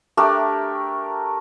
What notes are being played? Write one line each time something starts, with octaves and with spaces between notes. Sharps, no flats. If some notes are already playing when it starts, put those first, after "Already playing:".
A3 D4 G4 A#4